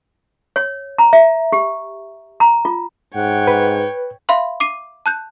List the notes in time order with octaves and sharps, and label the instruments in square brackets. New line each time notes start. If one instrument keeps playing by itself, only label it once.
[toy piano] C#5
A#5
E5
G4
A#5
F4
[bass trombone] G#2 [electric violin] C#5 G5 [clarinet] F#5
[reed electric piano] B4
[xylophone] E5 F5 B5 C6
D6 C7 D#7
A5 F#6 G6